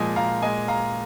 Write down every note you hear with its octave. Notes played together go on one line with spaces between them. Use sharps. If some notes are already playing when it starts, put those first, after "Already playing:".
Already playing: A#2 F3 G#3 D#5 G#5
F5 A#5
A#2 G#3 D#5 G#5
F5 A#5